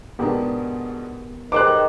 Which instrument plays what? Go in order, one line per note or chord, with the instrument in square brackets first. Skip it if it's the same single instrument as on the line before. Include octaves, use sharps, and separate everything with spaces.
[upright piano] G#2 B2 D4 [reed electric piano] B3 G4 A#4
[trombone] D#3 [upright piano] D#4 G4 C5 [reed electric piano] G#4 B4 [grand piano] D6 F#6